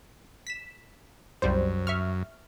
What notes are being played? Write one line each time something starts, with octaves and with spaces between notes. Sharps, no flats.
B6 E7
C2 F#2 G3 C5
E5 C#6 F6